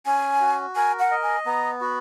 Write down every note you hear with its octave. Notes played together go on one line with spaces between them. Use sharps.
C#4 G#5
F#4
A#4 G#5
F#5
D#5
G#5
B3 A#5
F#4 B5